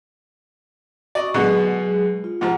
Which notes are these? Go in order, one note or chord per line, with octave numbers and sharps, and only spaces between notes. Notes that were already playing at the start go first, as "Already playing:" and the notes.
F#4 D5 D#5 C#6
B2 D3 F#3 G#3 B3 G#4
F4
G#2 C3 F3 F#5